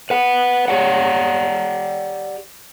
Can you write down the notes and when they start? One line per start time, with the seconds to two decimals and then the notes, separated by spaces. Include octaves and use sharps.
0.10 B4 F#5
0.68 G4 C#5 D5 F#5